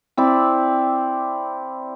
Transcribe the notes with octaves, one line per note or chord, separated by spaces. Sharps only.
C4 E4 D5